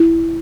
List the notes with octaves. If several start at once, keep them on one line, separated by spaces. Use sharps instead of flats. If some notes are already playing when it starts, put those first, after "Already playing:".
Already playing: E4